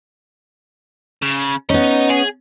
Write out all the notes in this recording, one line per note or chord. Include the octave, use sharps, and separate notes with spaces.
C#3
B3 C#4 D#4 D#5
G#4